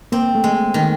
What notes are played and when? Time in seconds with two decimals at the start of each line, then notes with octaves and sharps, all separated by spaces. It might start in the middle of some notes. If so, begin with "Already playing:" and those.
0.12 A#3 C4
0.35 A3
0.44 G#3
0.74 D#3